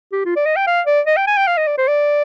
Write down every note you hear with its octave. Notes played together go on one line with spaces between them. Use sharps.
G4
F4
D5
D#5
G5
F5
D5
D#5
G5
G#5
G5
F5
D#5
D5
C5
D5